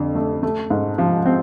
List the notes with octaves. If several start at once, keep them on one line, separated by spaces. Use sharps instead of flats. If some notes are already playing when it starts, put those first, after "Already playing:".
Already playing: F2 D3
A3
A3
G#2
F3
C4